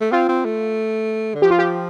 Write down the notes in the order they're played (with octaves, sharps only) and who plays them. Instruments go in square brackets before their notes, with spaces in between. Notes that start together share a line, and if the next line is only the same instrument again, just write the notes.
[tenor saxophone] A3
[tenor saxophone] C4 [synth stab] F4
[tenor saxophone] C4
A3
D3
[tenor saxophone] F3 [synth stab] G4
[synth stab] F4
G4